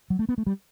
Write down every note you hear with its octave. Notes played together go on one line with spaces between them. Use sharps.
F#3
A3
B3
A3
G3